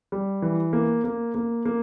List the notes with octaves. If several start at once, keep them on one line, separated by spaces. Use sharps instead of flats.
G3
E3
A#3
A#3
A#3
A#3